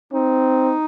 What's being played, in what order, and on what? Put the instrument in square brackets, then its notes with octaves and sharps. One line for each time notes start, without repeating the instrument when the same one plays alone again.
[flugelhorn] C4 [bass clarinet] D#4